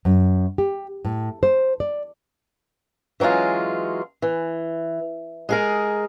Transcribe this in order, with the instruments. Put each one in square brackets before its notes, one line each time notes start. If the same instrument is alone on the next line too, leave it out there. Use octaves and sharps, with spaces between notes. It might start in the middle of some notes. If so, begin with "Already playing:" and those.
[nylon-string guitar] F#2
G4
A2
C5
D5
[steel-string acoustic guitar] E3 F#3 G#3 C#4 F4
E3
G#3 G#4 A#4